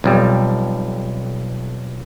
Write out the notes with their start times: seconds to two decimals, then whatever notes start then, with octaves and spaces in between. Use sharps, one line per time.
0.04 B1 F2 G3